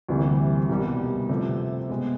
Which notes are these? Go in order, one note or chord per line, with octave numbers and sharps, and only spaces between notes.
D2 C3 E3 G3 A#3
C2 B2 G3 A#3
C3 F3 A3 C4
B2 G#3 B3